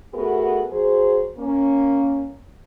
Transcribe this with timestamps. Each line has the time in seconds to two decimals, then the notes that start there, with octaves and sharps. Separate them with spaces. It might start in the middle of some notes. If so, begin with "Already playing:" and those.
0.14 A3 B3 F#4 G#4 A#4 B4
0.71 F#3 G#4 C5
1.38 A#3 C#4